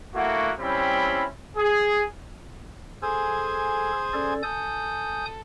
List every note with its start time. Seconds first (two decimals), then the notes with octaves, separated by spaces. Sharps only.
0.14 A3 A#3 E4 F#4
0.59 G3 C4 C#4 E4 G5 B5
1.57 G#4
3.02 G#4 A4 C5 G#5
4.13 C#4 A4 D5
4.43 A4 G#5 D#6 G6